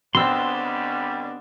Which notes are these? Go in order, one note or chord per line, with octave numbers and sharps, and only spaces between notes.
C#2 D3 G3 B3 C4 C6 E6